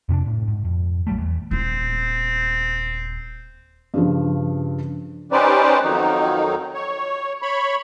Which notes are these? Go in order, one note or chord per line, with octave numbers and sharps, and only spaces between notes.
F2 C3 C#4 D4
A2
G#2
F2
A#1 F#3 G3 A3
E2
D#1 C4 E4
G2 C#3 F3
C#4 D#4 G4 B4 C5 D5
F2 D#3 F#3 D#4
C#5
C#5 B5